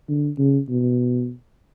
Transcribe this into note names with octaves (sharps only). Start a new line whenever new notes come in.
D3
C#3
B2